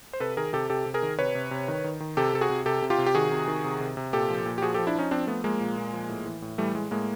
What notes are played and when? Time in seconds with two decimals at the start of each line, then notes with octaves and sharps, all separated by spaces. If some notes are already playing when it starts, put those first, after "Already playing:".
0.13 C5
0.20 C3 A4 B4
0.37 D#3 G#4 A#4
0.53 C3 G4 A4
0.70 C3 G4 A4
0.86 C3
0.94 G#4 A#4
1.02 D#3
1.19 C3 B4 C#5
1.35 C3
1.51 C3
1.68 D#3
1.84 D#3
2.00 D#3
2.17 C3 G4 A4
2.33 C3 A4
2.41 F#4 G#4
2.50 C3
2.66 C3 G4 A4
2.82 C3
2.90 F4 G4
2.98 C3
3.06 G4
3.15 D#3 F#4 G#4
3.32 C3
3.48 D#3
3.64 C3
3.80 C3
3.97 C3
4.13 A#2 G4 A4
4.30 F3
4.46 A#2
4.58 G4
4.62 F3 F#4 G#4
4.74 G4 A4
4.78 F3
4.87 D4 E4
4.95 F3 C#4 D#4
5.11 F3 C4 D4
5.27 F3 A3 B3
5.44 F3 G#3 A#3
5.61 A#2
5.77 A#2
5.93 F3
6.09 A2
6.26 E3
6.42 A2
6.58 E3 G3 A3
6.75 A2 G#3
6.91 A2 G#3 A#3